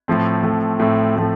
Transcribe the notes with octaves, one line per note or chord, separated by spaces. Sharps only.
A2 F3 A3 C4
A2 F3 A3 C4
A2 F3 A3 C4
A2 F3 A3 C4